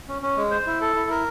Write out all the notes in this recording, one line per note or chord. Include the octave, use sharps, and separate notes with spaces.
C#4
C#4
G#3
C5
E4
A4
E4
A#4